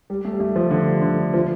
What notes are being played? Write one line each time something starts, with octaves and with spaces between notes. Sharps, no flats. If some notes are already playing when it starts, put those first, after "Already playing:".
G3
A3
G3
A3
F3
D3
D3
F3